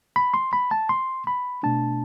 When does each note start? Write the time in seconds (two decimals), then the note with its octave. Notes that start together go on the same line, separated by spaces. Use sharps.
0.16 B5
0.34 C6
0.53 B5
0.71 A5
0.89 C6
1.27 B5
1.63 B2 A3 D4 A5